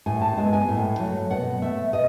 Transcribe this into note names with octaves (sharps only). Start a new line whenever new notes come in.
A2 G#5
A5
G#3 B3 G#5
G#5
A2
F#3 A3
B2 F#5
A3 E5
B2 D#5